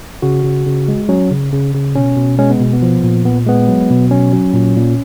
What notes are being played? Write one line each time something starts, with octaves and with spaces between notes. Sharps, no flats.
C#3 F#4
C#3
C#3
G#3
F#3 C#4
C#3
C#3
C#3
B2 C#4
B2
G#3 C#4
B3
B2
B3
F3
A#2
A#2 B3
G#3 B3
F#3
B2
F#3 C#4
F#3
A#2
A#2